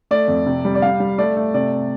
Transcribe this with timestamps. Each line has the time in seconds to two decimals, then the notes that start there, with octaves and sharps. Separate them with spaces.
0.11 A3 D5
0.28 F2
0.46 C3
0.65 G3
0.75 D5
0.82 G3 F5
1.00 G3
1.18 A3 D5
1.37 A3
1.54 C3 D5